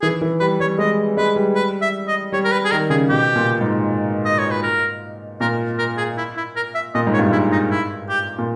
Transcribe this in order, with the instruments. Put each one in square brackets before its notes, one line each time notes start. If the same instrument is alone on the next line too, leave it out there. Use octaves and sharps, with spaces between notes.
[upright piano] E3 [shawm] G#4
[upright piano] E3
[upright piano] G3 [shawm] B4
[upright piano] G3 [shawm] C#5
[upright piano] G#3 [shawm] D#5
[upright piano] G#3 [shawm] B4
[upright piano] G3
[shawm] B4
E5
D#5
[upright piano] G3 [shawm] C#5
[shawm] A#4
B4
G#4
[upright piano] D#3 [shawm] A#4
[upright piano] C#3 [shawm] G#4
[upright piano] B2 [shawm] G4
[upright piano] A#2
G#2
[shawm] D#5
C#5
B4
A#4
[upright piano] A#2 [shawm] A#4
[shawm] A#4
G#4
E4
E4
A#4
E5
[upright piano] A#2 [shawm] D#5
[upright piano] G#2
[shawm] C#5
[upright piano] G2
[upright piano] G#2 [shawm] E4
[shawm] D#4
E4
G4
[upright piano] A#2